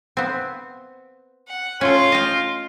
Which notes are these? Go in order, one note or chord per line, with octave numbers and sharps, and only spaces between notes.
B3 C4
F#5
A3 C#4 F4 F5
D#5 G5